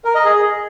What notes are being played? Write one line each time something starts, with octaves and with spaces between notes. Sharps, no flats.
A#4
D#5
G#4